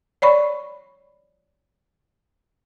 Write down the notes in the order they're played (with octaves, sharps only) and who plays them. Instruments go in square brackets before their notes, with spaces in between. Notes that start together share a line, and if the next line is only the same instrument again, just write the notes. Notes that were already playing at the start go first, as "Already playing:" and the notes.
[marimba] C#5 D5 B5 C#6